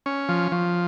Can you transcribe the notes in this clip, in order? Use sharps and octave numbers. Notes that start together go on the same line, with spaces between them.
C#4
F3
F3